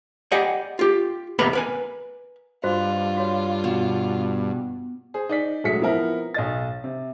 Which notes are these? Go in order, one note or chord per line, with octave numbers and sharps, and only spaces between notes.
G4 D5 D#5 F#5 G#5
F4 G4
D#2 C3 B3 B4 A#5 B5
A#4 B4 G#5
G2 F4 F#4 C5 D#5
F#4 C#5
B2
G#4 C5
D#4 D5 B6
E1 F#3 G#3 A3 B6 C#7
F3 B3 C4 E4 A#4
B1 D#5 A6
C3